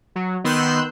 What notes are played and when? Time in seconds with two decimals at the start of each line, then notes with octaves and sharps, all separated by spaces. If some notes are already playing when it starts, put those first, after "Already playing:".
0.16 F#3
0.44 D#3 B3 C6 E6 F#6 G6